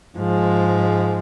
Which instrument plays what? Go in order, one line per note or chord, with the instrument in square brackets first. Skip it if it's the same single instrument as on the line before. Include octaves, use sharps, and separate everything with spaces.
[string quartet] G#2 F3 G#3